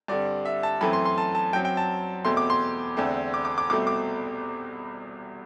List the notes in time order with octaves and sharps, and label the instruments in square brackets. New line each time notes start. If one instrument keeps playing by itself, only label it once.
[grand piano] G2 D3 G3 C4 D5
E5
A5
F#2 E3 A3 C4 B5
C6
C6
A5
A5
F#2 F#3 C4 G5
G5
A5
E2 B2 A3 C4 C6
D6
C6
E2 D3 A3 C4
D6
D6
D6
C2 B2 A3 C4 D6
D6